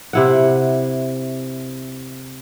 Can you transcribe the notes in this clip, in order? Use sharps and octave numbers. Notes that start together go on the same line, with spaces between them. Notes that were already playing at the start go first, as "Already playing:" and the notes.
C3 E4 F#5